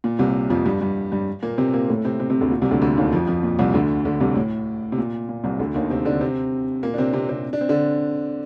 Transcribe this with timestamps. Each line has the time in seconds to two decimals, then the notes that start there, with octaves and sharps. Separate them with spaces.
0.04 A#2
0.19 C2 C3
0.50 F2 F3
0.65 G2 G3
0.81 G2 G3
1.12 G2 G3
1.43 A#2 A#3
1.58 C3 C4
1.73 A#2 A#3
1.89 A2 A3
2.05 C3 C4
2.20 C3 C4
2.30 C3 C4
2.41 D2 D3
2.51 A#2
2.61 C2 C3
2.71 D2 D3
2.82 D2 D3
2.97 D#2 D#3
3.13 F2 F3
3.27 F2 F3
3.43 A#2
3.59 C2 C3
3.74 D2 D3
4.05 D2 D3
4.20 C2 C3
4.35 A2
4.92 C3
4.98 A#2
5.29 A#2
5.43 C2 C3
5.59 D2 D3
5.74 D#2 D#3
5.90 C3 C4
6.05 D3 D4
6.21 C3 C4
6.83 A#2 A#3
6.94 D4
6.98 C3 C4
7.13 C3 C4
7.29 C3 C4
7.53 D4
7.61 C4
7.69 D3 D4